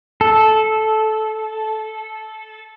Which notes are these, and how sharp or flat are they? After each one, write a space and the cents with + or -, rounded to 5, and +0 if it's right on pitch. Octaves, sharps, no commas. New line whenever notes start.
A4 -15